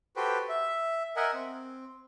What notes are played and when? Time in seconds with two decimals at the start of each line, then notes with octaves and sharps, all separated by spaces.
0.16 F#4 G4 A4 B4 C5 G5
0.49 E5
1.16 A#4 D#5 E5 F#5 G#5
1.34 C4